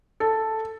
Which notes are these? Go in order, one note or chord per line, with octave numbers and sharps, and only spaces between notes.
A4